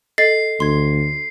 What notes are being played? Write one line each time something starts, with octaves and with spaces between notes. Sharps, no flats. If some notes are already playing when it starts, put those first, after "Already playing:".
A4 D#5 A6 C7
D2 C6 G#6